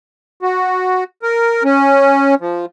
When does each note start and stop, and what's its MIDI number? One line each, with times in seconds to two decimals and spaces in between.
0.42 1.04 66
1.23 1.63 70
1.64 2.35 61
2.41 2.66 53